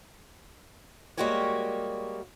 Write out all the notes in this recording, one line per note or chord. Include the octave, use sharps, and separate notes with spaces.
G3 G#3 A#3 F#4 G4 C#5